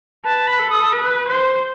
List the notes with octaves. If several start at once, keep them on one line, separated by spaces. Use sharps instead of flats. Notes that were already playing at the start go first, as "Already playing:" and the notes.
B4 A5
B5
A4
D#6
B4
C5